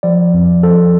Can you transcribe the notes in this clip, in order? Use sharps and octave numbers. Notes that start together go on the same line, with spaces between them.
F3 D5
F2
F3 A4